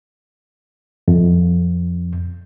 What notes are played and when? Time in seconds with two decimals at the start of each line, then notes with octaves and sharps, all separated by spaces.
1.08 F2